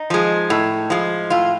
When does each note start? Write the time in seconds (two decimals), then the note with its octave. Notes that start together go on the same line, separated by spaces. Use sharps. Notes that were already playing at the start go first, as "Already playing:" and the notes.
Already playing: D#4
0.10 F3 G#3
0.50 A2
0.90 F3 G#3
1.30 A2 F4